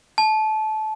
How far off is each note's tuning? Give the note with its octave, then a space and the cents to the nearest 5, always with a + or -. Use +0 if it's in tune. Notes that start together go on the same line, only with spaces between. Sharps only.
A5 -25